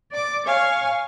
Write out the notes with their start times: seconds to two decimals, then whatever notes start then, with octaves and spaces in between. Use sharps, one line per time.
0.12 D5 D6
0.46 C#5 F5 G#5 C#6